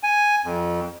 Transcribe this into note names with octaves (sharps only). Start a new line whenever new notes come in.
G#5
F2